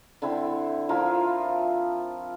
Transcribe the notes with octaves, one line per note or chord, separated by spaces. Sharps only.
D3 C4 E4
F3 E4 F4 A#4